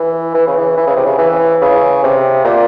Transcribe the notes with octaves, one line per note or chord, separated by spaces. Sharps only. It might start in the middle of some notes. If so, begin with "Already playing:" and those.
Already playing: E3
E3
C#3
E3
E3
C#3
C3
C#3
E3
C#3
C3
A#2